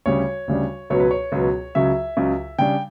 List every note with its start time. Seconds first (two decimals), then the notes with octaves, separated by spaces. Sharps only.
0.06 D2 C#3 G3 D4 C#5
0.48 D2 C#3 G3 D4
0.90 C#2 B2 F#3 B3 C#5
1.00 B4
1.11 C#5
1.32 C#2 B2 F#3 B3
1.75 C#2 C#3 F#3 E5
2.17 C#2 C#3 F#3
2.58 C#3 G3 D4 G5